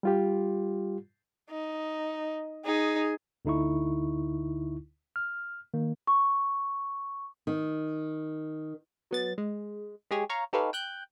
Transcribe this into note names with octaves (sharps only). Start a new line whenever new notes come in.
G3 F4 G4
D#4
D#4 G#4
D2 D3 D#4 E4 C#6
F6
D#3 A#3
C#6
D#3
F#3 B3 A6
G#3
G#3 G4 G#4 C#5
C#5 F5 A#5 C#6
D#4 G4 A4 B4 C#5 F5
G5 F#6 G6